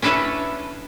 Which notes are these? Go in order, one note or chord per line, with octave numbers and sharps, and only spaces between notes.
C#4 D4 E4 A4 B4 C#5